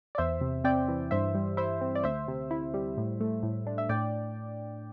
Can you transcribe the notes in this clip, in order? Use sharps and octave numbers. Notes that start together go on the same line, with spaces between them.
D5
E2 C5 E5
C3
C4 D5 G5
E3
G2 C5 E5
G3
E4 C5 E5
C4
D5
D2 C5 E5
C3
E4
G3
A2
A3
A2
D4
E5
A2 D5 G5